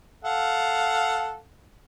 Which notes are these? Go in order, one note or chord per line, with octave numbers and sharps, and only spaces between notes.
A4 F5 F#5